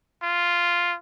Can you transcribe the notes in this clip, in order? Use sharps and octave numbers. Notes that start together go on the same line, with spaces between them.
F4